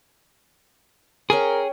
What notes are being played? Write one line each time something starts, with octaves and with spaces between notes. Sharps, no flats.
C#4 G#4 A#4 G5 C#6